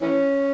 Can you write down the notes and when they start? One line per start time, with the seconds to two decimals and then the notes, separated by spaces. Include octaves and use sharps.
0.01 E3 C#4